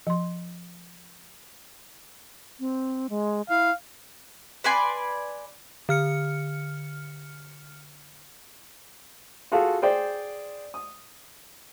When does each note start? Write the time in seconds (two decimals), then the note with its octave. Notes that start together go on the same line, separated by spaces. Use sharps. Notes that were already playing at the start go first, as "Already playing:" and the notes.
0.07 F3 C6
2.60 C4
3.10 G#3
3.49 E4 F5
4.64 B4 D5 G#5 C6
5.89 D3 F6 C#7
9.52 F4 F#4 G#4 A4 F5
9.82 G#4 C5 D5 G5
10.74 D#6